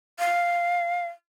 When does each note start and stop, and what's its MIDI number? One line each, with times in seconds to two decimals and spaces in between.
0.19 1.07 77